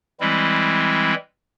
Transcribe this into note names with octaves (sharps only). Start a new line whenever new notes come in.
E3 G3 G#3 C4 E4